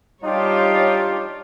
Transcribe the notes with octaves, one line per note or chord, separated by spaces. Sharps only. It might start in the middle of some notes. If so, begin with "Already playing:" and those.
G3 D4 D#4 F4 G4 C#5